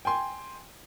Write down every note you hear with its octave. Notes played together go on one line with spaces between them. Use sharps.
G5 G#5 C6